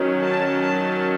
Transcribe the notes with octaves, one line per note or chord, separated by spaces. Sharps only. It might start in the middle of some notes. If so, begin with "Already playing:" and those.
Already playing: D#3 F#3 C#4
A5
A5